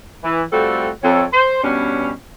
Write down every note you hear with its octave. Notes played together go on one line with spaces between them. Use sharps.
E3
G3 A3 C4 F4 F#4 A4
F2 A4 C#5
C5
G2 B2 G3 C#4